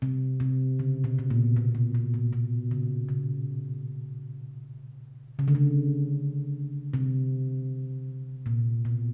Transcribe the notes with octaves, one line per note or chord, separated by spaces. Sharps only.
C3
C3
C#3
B2
B2
A#2
B2
B2
B2
A#2
B2
C#3
C#3
C#3
D3
C#3
C3
A#2
B2